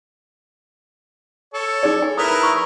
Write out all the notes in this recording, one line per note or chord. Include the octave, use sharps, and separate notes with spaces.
A4 C#5
D#4 G#4 D5
G#5
E4 A#4 B4 D#6 E6
C#6